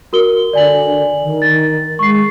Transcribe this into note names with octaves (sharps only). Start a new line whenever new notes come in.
F#4 A#4 G7
D3 D5 G#5 F#7
D#3
A6
G#3 C#6 C7